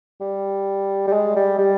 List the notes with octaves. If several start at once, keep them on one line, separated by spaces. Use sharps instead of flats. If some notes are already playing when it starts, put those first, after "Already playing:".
G3
G3
G#3
G3
G3